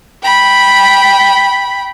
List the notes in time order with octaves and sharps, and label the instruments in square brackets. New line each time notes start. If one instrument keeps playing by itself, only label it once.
[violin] G5 B5